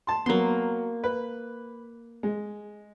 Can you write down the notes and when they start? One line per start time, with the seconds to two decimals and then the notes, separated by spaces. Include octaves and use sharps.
0.07 A5 C6
0.26 F#3 A#3 B3 C6
1.04 B4
2.23 G#3